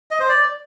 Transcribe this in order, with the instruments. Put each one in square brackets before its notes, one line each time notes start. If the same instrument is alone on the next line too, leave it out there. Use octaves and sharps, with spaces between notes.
[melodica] D#5
C5
D5